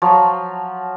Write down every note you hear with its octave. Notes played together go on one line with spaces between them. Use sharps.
F3 F#3